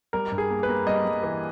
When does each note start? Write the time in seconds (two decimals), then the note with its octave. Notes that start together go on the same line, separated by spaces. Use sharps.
0.13 G3 A#4
0.32 G2
0.38 G#4
0.50 A#3
0.63 B4
0.69 A#3
0.87 G3 D#5
1.05 G3
1.23 E3